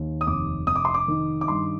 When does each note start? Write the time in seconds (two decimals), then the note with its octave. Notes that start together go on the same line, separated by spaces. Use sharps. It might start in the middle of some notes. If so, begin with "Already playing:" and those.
Already playing: D#2
0.21 D#6
0.27 F1 D6
0.67 F1 D#6
0.76 D6
0.85 C6
0.94 D6
1.08 D#3
1.41 D6
1.48 G2 C6